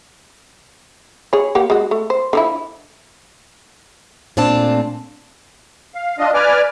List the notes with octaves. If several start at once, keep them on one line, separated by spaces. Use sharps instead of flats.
G#4 C#5
A#3 G4 F#5
G#3 F#4
A3
C5
D3 F3 E4
A#2 A3 C4 D4 A5
F5
D4 F4 D#5
B4 D5 G#5 D6 F6